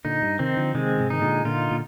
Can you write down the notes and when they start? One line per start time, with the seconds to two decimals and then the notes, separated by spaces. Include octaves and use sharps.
0.05 A#2 D3 D#4
0.22 G2
0.39 C3 D#3 C4
0.57 D3 F3
0.75 C3 D#3 G#3
0.98 G#2 C3
1.10 D#3 D#4
1.21 A#2 D3
1.45 A#2 D3 F4
1.71 A#2